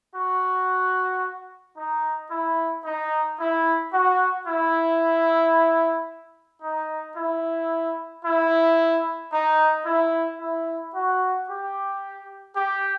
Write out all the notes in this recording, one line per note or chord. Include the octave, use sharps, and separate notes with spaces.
F#4
D#4
E4
D#4
E4
F#4
E4
D#4
E4
E4
D#4
E4
E4
F#4
G4
G4